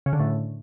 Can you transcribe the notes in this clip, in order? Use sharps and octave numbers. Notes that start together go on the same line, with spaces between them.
C#3
D3
A2